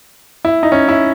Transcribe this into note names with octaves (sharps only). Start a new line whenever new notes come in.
E4
D#4
C#4
E4